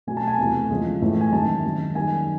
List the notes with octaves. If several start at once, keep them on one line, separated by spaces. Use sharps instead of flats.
B2 F#3 A3 G#5
A5
G#5
E2 C3 E3 A3
E2 C#3 F3 G#3
A2 E3 A3
G#5
F#2 D#3 G#3 A5
F#2 D#3 G#3
F#2 D#3 G3 A#3 G#5